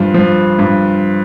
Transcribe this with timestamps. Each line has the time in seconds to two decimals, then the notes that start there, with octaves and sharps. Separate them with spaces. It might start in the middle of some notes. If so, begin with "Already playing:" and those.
Already playing: G2 F3
0.14 F3
0.59 G2